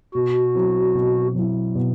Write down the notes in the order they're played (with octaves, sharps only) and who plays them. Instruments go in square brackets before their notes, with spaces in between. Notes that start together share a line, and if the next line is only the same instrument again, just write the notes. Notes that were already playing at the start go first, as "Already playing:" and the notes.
[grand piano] B2 [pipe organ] F#4
[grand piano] F#3 C4 E4
B2
F#3 C4 E4
B2